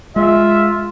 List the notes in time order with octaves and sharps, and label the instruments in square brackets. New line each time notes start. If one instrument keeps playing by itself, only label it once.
[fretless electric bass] G#3 [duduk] F4 [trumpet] E5